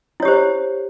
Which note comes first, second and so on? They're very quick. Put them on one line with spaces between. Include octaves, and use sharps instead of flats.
E4 C#5 G4 C5